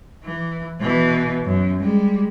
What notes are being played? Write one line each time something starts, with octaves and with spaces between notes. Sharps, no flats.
E3
B2 E3
F#2
G3 G#3